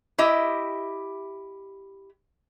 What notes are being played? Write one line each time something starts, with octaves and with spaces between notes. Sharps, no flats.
E4 G4 D#5 E5